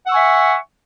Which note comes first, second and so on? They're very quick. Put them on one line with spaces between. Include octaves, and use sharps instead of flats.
F#5 E6 C#6 G#5 E5